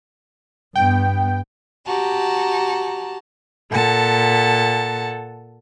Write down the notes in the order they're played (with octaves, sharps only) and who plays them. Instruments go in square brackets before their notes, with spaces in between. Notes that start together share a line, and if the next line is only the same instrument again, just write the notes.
[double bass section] G2 B3 [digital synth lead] G5
[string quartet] F#4 G4 A5 A#5
A#2 A4 F#5 A5